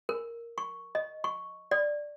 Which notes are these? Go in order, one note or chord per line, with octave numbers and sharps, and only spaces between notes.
A#4
C#6
D#5
C#6
D5